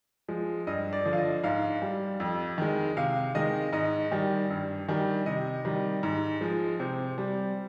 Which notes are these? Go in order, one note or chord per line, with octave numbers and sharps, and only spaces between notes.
F3 G#3
G2 D#5
D5
D3 F3
F5
D#5
G#2 F5
G3
F2
D#3 G#3
C3 F5
D#3 G#3 D#5
G#2 D#5
D#3 G3
G2
D#3 G3
C3 D#5
D#3 G3
G#2
F3 G#3
C3 C5
G3